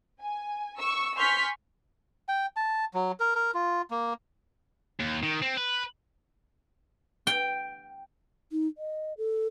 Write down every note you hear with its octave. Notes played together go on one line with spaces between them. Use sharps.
G#5
C#6 E6
G#5 C6 C#6 F6 G6 B6
G5
A5
F#3
A#4
A#4
F4
A#3
D#2
D#3
C4
B4
G5
D#4
D#5
A4